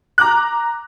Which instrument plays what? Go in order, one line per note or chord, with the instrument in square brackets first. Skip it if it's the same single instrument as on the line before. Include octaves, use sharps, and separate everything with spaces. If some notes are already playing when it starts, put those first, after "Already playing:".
[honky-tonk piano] A#5 D6 F#6